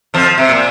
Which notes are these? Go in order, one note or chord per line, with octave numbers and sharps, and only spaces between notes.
F2 F3
C3
A#2